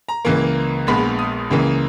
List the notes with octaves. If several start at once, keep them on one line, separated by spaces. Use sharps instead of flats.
A#5
C#2 C#3 E3 A#3
A#1 A#2 G#3 B3 B5
D#6
C#2 C#3 E3 A#3